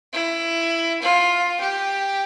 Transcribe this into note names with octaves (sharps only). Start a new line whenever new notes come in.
E4
F4
G4